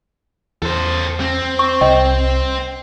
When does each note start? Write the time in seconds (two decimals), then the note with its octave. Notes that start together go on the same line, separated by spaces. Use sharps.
0.62 E2 A4 C5
1.20 C4
1.59 C#6
1.81 C2 D#5 G5